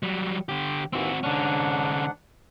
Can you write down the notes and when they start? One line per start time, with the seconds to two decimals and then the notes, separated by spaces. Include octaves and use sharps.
0.03 F#3 G3
0.49 D3 G4
0.93 D#2 E3 C4 F#4 E6
1.23 G#2 D3 C#4 D4 F#5